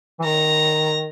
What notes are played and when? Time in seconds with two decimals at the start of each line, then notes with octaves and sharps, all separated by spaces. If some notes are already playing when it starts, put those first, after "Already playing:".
0.19 E3
0.25 D#3 A#5